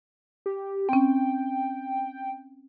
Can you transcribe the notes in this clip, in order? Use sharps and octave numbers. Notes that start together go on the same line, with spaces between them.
G4
C4 C#4 G5